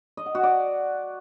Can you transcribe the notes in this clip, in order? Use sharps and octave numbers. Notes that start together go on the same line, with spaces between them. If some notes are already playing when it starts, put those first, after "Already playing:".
D#5
F#5
F#4
D5